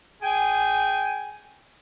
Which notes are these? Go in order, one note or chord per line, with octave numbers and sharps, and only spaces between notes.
G#4 G5 G#5